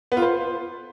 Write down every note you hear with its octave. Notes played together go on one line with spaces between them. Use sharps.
B3
F4
C5